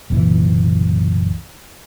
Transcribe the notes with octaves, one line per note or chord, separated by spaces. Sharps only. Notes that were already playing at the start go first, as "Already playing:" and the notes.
F#1 C2 A#2 E3